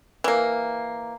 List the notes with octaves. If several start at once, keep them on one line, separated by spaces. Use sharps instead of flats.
E3 A#3